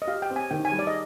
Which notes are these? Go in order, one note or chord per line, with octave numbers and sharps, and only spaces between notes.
D#5
G4 F5
G5
C4
G#5
D#3 G5
G#5
G3
D5
D#5